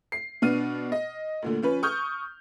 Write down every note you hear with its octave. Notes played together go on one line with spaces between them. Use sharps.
C7
B2 B3 D4 F6 D#7
D#5
D2 A#2 D3
F3 C#4 B4
C#6 D#6 F6 G6